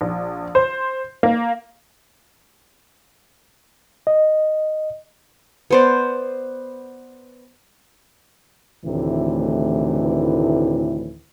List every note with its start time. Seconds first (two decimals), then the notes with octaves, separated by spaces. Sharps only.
0.01 A#1
0.55 C5
1.23 A#3
4.07 D#5
5.71 B3 C5 D5
8.85 D2 A2 C3 D#3 E3